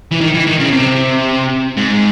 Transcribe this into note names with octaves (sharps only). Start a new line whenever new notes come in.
E3
D#3
E3
D#3
C#3
C3
G#2